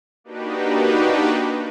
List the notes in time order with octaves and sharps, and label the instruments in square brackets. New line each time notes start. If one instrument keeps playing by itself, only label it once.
[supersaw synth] A#3 D4 D#4 F#4 G4 B4